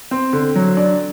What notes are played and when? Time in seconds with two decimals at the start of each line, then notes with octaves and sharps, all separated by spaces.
0.11 C4
0.33 D3
0.56 F#3
0.77 D4